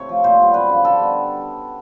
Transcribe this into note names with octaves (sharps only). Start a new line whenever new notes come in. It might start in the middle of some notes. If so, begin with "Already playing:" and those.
Already playing: C3 A4 C#5
F3 A3
A#2 C5
G3 B3
F#2 B4
C#3 F3
D3 A4
G3 B3